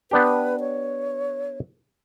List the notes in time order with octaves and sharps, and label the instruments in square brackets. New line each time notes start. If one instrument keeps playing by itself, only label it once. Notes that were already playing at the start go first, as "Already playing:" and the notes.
[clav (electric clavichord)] B3 D4 G4 [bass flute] B4
[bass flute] C#5